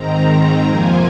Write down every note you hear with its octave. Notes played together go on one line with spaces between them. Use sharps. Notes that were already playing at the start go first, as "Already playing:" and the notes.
Already playing: G#2 D#3 C4 A#5
F2 C3 F3 A#3 F4 G#5